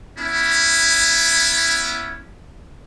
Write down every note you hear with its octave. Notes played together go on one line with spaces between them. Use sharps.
B3 C#4 E4